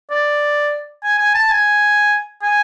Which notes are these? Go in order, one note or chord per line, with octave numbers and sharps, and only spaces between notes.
D5
G#5
G#5
A5
G#5
G#5